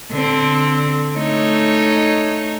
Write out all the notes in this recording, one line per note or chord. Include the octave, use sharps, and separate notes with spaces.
D3 C4
A3 D#4 C#5